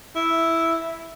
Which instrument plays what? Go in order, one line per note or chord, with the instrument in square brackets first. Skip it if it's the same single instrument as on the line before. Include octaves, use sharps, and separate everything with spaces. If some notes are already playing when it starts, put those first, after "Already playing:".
[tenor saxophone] E4